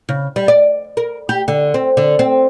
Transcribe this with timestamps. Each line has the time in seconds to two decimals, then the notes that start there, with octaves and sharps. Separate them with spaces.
0.09 C#3
0.36 G3
0.48 D5
0.97 A#4
1.29 G4
1.48 D3
1.74 C4
1.97 D3
2.19 C4